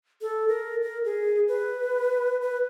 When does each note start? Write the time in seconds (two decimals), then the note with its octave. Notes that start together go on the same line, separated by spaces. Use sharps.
0.22 A4
0.48 A#4
0.82 A#4
1.05 G#4
1.48 B4
2.41 B4